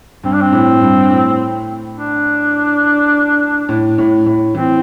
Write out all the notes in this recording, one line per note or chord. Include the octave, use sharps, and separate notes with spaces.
G2 C4
D4
C4
A2
G2
A2
D4
A2
A2
A2
E3 C4